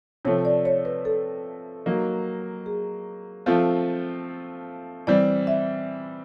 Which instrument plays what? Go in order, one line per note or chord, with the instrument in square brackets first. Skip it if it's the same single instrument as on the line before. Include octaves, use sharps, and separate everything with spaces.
[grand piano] C3 F3 A3 [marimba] C#5
[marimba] D5
C#5
B4
A4
[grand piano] F#3 A#3 D#4
[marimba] G#4
[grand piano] F3 A3 C4 F4
[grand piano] E3 G3 C4 [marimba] D5
[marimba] E5